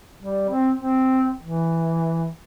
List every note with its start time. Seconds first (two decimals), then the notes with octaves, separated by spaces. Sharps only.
0.20 G3
0.49 C4
0.76 C4
1.42 E3